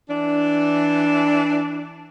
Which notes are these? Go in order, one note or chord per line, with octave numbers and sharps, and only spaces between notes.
E3 D4